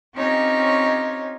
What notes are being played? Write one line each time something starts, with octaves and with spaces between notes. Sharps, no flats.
C4 C#4 D#4 F4 G4 C#5